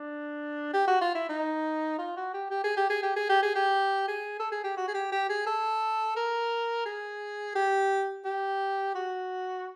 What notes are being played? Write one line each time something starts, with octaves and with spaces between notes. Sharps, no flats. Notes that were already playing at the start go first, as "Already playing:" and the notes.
Already playing: D4
G4
F#4
F4
E4
D#4
F4
F#4
G4
G4
G#4
G4
G#4
G4
G#4
G4
G#4
G4
G#4
A4
G#4
G4
F#4
G#4
G4
G4
G#4
A4
A#4
G#4
G4
G4
F#4